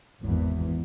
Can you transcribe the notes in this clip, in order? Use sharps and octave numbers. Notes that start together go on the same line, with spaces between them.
G#1 E2 E3